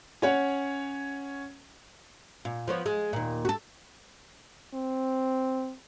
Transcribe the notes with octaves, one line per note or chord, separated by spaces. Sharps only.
C#4 C#5 F#5
A#2
F3 B3 C#5
G#3
D#2 A#2
F#4 A4
C4